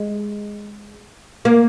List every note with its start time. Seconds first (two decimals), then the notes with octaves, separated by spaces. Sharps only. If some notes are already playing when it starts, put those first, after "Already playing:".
Already playing: G#3
1.45 A#3